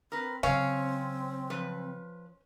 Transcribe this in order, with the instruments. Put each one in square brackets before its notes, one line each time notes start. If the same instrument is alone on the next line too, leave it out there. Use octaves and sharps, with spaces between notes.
[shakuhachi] C4 [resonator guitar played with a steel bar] A#4 B4
[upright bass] C#3 F#3 [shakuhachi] C4 [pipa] C#4 [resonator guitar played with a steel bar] C#5 F5
[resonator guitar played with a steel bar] F3 B4